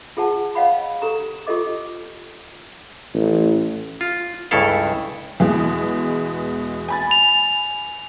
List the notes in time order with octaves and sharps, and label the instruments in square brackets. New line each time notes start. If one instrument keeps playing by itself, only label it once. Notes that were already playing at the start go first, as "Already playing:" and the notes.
[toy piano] F4 G#4 F#5 A5
C#5 D#5 F5 F#5 B5
G4 A4 A#5
F4 G4 A4 D#5 D6
[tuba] A1
[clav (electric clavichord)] F4
C#2 G2 C#3 E4 A4 F5
[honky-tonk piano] E2 B2 G#3
G#5 B5 A6
[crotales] F7